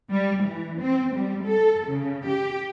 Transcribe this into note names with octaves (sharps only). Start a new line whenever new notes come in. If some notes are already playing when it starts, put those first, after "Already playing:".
G3
E3
C4
G3
A4
C#3
G4